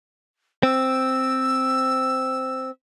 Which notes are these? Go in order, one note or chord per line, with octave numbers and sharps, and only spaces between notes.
C4 E6